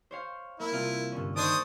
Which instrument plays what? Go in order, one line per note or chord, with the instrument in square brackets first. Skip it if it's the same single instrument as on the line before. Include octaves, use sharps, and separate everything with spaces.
[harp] C5 C#5 F5
[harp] A#3 [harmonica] E4
[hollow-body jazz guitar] C2 F4
[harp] G2 D3 C#4
[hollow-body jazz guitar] D#3 [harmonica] D4 C5 D#6 [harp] C#6 G#6 D7